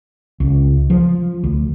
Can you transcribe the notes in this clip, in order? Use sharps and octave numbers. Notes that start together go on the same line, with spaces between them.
C#2
F3
D2